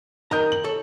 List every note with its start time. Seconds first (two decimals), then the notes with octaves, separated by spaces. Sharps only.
0.31 D#3 A#4 D#5 A#5 G6
0.52 F#7
0.64 A4 C#5